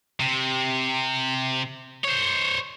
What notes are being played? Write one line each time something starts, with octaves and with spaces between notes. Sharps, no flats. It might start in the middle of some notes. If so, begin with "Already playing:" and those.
C3
C5 C#5